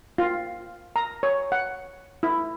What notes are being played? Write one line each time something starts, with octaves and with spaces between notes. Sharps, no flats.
F4
A#5
C#5
F#5
E4